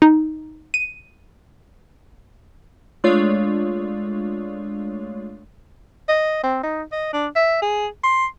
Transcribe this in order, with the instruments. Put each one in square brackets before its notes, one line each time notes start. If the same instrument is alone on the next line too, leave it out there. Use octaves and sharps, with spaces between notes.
[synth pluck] D#4
D#7
[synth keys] G#3 A3 D4 F4 C#5 D5
[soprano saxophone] D#5
C4
D#4
D#5
D4
E5
G#4
C6